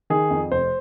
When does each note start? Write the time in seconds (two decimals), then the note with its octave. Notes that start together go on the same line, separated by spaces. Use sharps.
0.10 D#3 G#4
0.30 F2
0.51 F1 C5